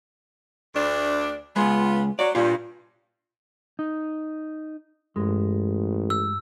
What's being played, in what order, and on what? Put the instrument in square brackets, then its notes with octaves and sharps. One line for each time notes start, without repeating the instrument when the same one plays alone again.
[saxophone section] D2 D4
[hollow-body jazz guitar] C#2 G#3 [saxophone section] B3 F4
[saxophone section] F#3 [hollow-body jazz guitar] D5
[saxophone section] G2 [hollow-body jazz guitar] A#2 F4
[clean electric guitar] D#4
[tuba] A1 [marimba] G2 [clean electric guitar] G#3
[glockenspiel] E6